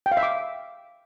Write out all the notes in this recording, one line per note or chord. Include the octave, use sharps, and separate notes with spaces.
G5
F5
E5
D6